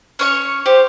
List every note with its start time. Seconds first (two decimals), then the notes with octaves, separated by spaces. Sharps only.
0.19 C#4 C#5 C#6
0.66 G4 C5